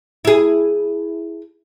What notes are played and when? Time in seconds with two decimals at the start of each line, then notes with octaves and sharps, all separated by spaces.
0.25 E4 G#4